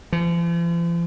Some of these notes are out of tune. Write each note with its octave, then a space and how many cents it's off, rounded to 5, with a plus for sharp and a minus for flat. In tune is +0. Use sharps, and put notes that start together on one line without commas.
F3 -45